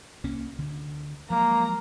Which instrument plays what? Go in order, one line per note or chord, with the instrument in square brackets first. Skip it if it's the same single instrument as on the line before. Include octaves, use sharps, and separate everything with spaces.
[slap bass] C2 A#3 C#4
D2 D3
[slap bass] F3 F#3 G#3 [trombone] A#3 [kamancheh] A#5